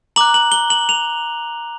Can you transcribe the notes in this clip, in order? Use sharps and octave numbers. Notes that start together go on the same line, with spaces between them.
A#5 D6 F#6 F#7
F#7
G7
F#7
F7